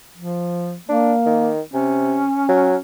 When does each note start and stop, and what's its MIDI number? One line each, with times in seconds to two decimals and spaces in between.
0.17 0.77 53
0.89 1.48 58
0.89 1.14 62
1.26 1.61 51
1.74 2.23 48
1.74 2.78 61
2.49 2.76 54